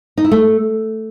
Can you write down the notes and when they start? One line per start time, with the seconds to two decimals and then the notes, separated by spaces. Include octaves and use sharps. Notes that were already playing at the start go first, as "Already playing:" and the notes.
0.17 D#4
0.24 E4
0.31 A3